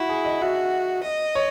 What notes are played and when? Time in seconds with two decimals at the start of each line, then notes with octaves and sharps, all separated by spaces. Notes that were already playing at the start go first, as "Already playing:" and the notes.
Already playing: E4 F#4
0.09 G#4
0.25 D#5
0.42 F#4 E5
1.03 D#5
1.35 C#5